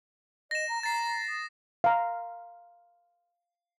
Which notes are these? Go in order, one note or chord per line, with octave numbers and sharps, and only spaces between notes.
D#5 A#6 E7
A#5
A#5 A6 C7
D#6
F5 A#5